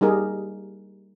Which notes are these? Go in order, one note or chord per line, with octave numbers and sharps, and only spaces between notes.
G3 A#3 D#4 G4 G#4 A#4